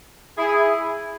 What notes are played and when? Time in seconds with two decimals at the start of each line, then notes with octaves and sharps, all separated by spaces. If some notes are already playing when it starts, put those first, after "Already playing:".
0.38 E4 G#4